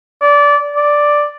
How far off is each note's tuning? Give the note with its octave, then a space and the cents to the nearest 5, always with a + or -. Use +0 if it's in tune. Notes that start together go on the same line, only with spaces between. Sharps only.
D5 -20
D5 +0